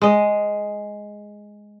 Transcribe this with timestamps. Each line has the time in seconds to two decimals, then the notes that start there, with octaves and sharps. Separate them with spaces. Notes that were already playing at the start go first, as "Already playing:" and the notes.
0.02 G#3 D#5